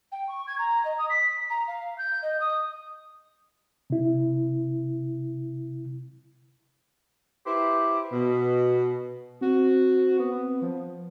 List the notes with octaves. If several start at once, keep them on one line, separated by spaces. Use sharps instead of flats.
G5
C#6
G#6
A#5
D#5
D#6
B6
A#5
F5
G6
D#5
D#6
C3 E4
E4 G4 B4 C5
B2
C4 F#4
B3
F3